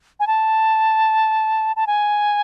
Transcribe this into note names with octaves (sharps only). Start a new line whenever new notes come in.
G#5
A5
A5
G#5